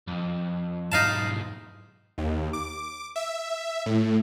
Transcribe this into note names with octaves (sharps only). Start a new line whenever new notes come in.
F2
B1 G#2 D#4 F5 A5
D#2
D6
E5
A2